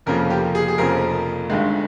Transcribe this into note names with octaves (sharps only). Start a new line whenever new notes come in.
F1 F2 C#3 F3 A#3 A#4
G4
G#4
G#4
F1 F2 C#3 F3 A#3 A#4
G1 G2 D#3 G#3